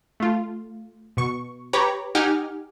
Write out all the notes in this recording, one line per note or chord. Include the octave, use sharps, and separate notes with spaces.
A3 F4
B2 C#6
G4 B4 C#5 A#5 B5 D6
D#4 G4 F#5 G#5 D6 F6